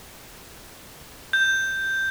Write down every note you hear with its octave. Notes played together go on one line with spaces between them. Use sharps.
G6